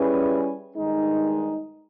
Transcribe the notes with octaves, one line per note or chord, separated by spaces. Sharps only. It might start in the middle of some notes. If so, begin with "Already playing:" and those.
Already playing: G3 C#4 E4 G#4 B4
G2 D#3 G#3 D#4